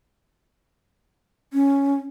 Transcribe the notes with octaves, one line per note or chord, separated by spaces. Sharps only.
C#4